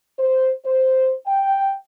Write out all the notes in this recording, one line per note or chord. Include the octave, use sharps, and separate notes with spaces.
C5
C5
G5